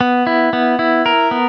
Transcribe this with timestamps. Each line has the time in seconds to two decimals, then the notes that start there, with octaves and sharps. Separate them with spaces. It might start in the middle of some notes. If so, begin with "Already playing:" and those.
0.01 B3
0.27 E4
0.53 B3
0.79 E4
1.06 A#4
1.31 B3